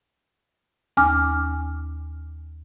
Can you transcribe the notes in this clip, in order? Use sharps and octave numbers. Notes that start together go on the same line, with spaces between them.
D#2 C#4 G#5 D6 F6